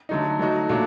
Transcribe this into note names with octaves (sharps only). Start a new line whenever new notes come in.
D3 F#3 A3 D#4
F#3 A3 D#4 F#4
A#2 F#3 A3 D4